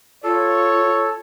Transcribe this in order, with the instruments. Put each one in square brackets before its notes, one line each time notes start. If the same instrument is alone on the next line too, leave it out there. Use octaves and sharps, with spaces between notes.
[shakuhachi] F4 [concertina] A4 [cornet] C#5